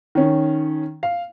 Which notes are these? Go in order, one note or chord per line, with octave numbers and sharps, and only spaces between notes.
D#3 C#4
F5